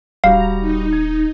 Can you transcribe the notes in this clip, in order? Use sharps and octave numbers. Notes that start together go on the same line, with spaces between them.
D#1 G3 F#4 F5 A#5
D#4
G#6